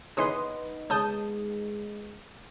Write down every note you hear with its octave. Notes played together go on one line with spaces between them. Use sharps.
C#3 E3 B3 C#4 D#4 B4 C6 D#6
C#3 G#3 A5 D#6 G6